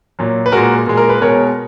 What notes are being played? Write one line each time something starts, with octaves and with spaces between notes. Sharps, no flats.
A#2 F#3
B4
A#2 G#3 F#4 A#4
A#2 G#3
A#4
B4
B2 G#3 A#4 C#5